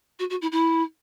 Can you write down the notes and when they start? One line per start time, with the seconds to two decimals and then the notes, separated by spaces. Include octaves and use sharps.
0.19 F#4
0.30 F#4
0.42 E4
0.52 E4